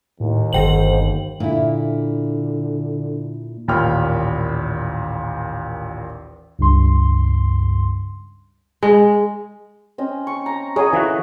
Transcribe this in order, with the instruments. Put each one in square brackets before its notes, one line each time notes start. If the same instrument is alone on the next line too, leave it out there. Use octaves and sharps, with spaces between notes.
[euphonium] D#2 [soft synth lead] A2
[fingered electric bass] G1 [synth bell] D#3 G5 F#7 [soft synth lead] C5
[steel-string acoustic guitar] A#2 E4 [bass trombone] D3
[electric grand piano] A1 D#2 A#2 G5 B5 F6
[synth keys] C#2 G2 C6
[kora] G#3
[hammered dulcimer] C4 C#4 D#5
[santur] C#6
A#5
[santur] F#3 [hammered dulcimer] F#4 A#4 D#5 [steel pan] G#4
[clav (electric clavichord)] E3 F#4 [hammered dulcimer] A4 F5 B5